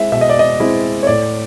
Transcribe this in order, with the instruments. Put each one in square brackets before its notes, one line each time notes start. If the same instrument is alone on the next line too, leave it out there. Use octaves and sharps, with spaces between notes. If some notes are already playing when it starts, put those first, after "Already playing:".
Already playing: [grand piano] G#3 C4 E4 E5
B2 E5
D#5
D5
D#5
G#3 C4 E4
C#5
A2 D5